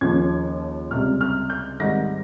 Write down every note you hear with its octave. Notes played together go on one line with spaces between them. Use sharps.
D#2 C#3 F3 G#6
C#2 C3 G3 F6
F6
G6
G#1 G#2 D#3 G3 A#6